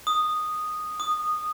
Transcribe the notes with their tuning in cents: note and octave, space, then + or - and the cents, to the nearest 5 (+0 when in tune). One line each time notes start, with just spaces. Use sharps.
D#6 -10
D#6 -15